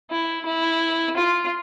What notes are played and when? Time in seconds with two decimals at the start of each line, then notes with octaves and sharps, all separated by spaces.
0.11 E4
0.45 E4
1.17 F4